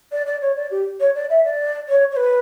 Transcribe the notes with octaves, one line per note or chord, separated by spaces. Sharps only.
D5
D5
C#5
D5
G4
C#5
D5
E5
D5
C#5
C#5
B4